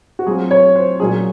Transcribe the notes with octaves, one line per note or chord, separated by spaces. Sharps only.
F#4
F#3 C4 F4 G#4
C#5
C5
A#2 F#3 C#4 F4 G#4